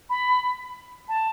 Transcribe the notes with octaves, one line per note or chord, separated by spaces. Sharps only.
B5
A5